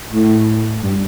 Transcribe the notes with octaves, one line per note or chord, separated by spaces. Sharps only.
A2
G2